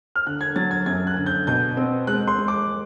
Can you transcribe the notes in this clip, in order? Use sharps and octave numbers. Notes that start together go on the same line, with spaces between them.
F6
D3 F#6
G#6
F#3 A6
G#6
F#2 G#6
F#6
D3
G6
B2 G6
C4
G#3 F#6
C6
G#3
D6